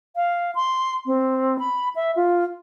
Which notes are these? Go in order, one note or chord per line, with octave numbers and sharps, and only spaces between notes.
F5
C6
C4
B5
E5
F4